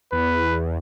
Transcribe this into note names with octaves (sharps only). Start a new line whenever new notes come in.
E2 B4